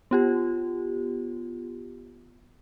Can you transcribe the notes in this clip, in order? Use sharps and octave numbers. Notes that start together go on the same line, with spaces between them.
B3 F4 G4